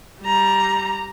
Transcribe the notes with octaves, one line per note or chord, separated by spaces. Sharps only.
G3 A#5